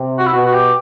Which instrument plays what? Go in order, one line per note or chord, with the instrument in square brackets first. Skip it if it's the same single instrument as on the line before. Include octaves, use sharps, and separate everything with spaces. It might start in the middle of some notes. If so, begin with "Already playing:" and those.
Already playing: [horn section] C3
[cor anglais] F#4
E4
[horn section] B2 [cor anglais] F#4
[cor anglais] F#4
G4